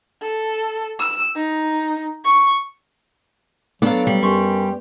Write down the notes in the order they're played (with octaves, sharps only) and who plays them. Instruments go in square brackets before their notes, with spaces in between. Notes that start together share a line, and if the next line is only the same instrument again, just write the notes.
[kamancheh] A4
E6
D#4
C#6
[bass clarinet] F#3 [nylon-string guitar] B3 [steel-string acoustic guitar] D4 A4 [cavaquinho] F5 D6
[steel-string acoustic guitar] G3
[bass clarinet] F#2 [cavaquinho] G4 C6 C#6